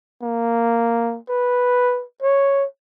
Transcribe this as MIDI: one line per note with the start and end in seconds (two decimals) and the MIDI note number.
0.23 1.18 58
1.29 2.04 71
2.23 2.66 73